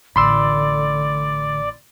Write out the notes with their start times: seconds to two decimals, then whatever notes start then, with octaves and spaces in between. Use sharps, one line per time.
0.16 A1 A2 D3 D5 B5 C6 E6